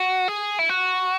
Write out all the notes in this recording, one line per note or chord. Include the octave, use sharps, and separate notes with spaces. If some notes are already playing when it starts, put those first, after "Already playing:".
Already playing: F#4
G#4
E4
F#4